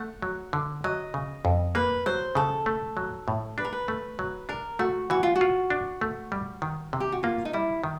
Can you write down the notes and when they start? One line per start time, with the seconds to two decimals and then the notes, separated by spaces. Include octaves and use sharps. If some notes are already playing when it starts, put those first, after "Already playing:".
Already playing: A3 F#5
0.22 F#3
0.53 D3
0.84 F#3 D#5
1.14 C#3
1.45 F2
1.75 A#3 B4
2.06 F#3 C5
2.35 C#3 A4
2.66 A3
2.97 F#3
3.28 A2
3.58 D4 B4
3.65 A#4
3.73 B4
3.88 A3
4.19 F#3
4.49 D4 A#4
4.79 A3 F#4
5.10 E3 F#4
5.23 F4
5.36 F#4
5.41 F4
5.70 D4
6.01 A3
6.32 G3
6.62 D#3
6.93 C3
7.00 G4
7.12 F#4
7.23 A#3 F4
7.45 D#4
7.53 G3 E4
7.84 D#3